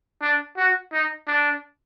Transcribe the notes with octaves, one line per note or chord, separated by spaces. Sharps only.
D4
F#4
D#4
D4